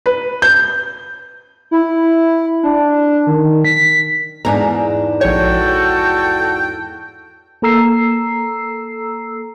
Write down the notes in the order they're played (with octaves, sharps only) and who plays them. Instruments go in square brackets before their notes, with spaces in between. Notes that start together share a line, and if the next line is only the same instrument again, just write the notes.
[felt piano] B4
G6
[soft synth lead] E4
D4
D#3
B6
[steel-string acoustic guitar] E2 G#2 D4 [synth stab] A#5
[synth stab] A#1 C#5 [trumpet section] F#4 A4 [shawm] G5
[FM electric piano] A#3 A4 A#5 E6 C7